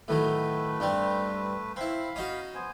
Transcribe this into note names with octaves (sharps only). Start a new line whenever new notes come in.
A2 D#3 F#3 A3 B4
G2 G3 C4
C4 E4 F5 B5
C#4 D#4 F#4
B3 C5 G#5